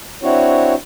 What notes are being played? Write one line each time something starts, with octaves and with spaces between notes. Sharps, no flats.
C4 D4 E4 F#4 C#5